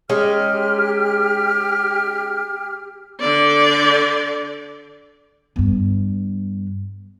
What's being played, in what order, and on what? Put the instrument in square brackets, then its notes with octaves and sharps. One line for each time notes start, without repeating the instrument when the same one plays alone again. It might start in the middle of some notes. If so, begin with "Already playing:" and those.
[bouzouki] G#3 C#4 D#4 [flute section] G4 F6
[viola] D3 D5
[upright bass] G2 B3